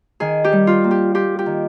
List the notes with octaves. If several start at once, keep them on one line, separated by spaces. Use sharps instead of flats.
D#3 G#4
G4
G3
F4
A#3
G4
F4 G4
G4
D#3